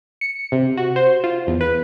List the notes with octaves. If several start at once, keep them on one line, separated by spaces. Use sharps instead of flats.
C#7
C3
F#4
C5
F4
E2
B4